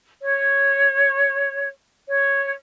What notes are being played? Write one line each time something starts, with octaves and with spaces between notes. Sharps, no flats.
C#5
C#5